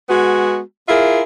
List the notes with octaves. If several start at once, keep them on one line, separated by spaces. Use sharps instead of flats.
G#3 B3 F#4
E4 F4 G#4 A#4 E5